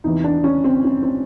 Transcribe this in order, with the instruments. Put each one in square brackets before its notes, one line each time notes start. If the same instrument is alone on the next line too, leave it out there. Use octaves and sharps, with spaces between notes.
[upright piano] E2 C3 E3 D#4
D4
C#4
C4
C#4
C4